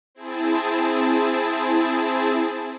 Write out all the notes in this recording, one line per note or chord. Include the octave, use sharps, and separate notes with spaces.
C4 E4 G#4 A5